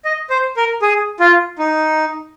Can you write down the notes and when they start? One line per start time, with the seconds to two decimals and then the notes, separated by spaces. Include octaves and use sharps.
0.05 D#5
0.30 C5
0.57 A#4
0.82 G#4
1.20 F4
1.59 D#4